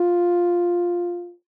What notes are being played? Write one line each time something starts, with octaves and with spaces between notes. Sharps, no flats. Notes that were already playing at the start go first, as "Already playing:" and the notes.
Already playing: F4